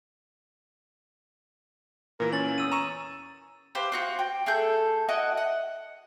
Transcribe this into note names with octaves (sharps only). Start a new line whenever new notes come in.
A#2 E3 A#4
C#4 A6 F#7
E2 D#6 E6 D#7
A#5 C#6 D#7 E7
G4 B4 C5 F5
F4 F#4 C5
G5
A3 G#4 A4 G6
E4 F#4 D#5 F#5
F#5